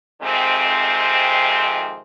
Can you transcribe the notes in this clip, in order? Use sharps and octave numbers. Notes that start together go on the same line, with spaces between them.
F2 C3 D#3 G#3 C4